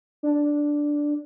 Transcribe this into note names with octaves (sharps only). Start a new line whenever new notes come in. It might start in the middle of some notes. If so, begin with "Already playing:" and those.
D4